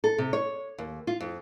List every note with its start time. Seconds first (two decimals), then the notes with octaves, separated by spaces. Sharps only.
0.04 A4
0.18 C3
0.33 C#5
0.78 D#2
1.07 F4
1.20 F2